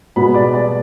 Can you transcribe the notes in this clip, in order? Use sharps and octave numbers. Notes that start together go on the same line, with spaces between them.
B2 G#3 B3 B5
D5
D5